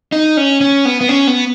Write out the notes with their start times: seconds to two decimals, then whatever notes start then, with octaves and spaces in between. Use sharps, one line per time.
0.12 D#4
0.37 C#4
0.61 C#4
0.85 B3
1.01 B3
1.09 C#4
1.27 B3